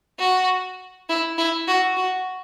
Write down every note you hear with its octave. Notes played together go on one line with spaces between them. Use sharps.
F#4
E4
E4
F#4
F#4